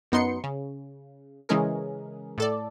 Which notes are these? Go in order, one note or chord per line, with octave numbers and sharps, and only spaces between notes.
F#2 B3 D#4 C6 C#7
C#3
C#3 E3 G#3 C#4 G#4 A#4
A2 A4 D5